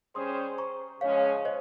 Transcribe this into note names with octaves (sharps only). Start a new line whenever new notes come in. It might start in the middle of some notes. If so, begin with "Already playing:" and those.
G3 C#4 G#4 C5 C6 D#6
A#5 C#6
C#3 F3 G#3 C#4 C#5 F5
C5 D#5